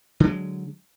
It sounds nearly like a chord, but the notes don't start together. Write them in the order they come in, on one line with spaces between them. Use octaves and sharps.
D3 F#3 G#3